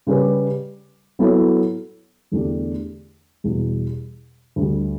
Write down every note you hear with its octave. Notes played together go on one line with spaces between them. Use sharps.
C#3 G3 C#4 G4 B4
F#3 B3 E4 A4 C#5
E2 D3 A3 D4 G4
E2 B2 G3
D2 D3 G3